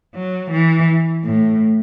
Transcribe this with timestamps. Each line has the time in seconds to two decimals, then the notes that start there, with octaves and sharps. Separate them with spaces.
0.15 F#3
0.51 E3
1.24 A2